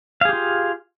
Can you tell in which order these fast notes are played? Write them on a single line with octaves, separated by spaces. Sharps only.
F5 G#4 G4 F4